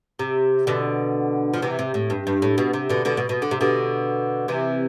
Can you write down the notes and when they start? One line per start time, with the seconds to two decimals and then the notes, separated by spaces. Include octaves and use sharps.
0.19 C3
0.67 B2 D3
1.54 F3
1.62 C3 E3
1.79 C3
1.94 A2
2.10 G2
2.27 G2
2.42 A2
2.58 B2
2.73 C3
2.89 B2 D3
3.05 B2 D3
3.17 B2
3.29 B2
3.42 D3
3.51 C3
3.61 B2 D3
4.48 C3 E3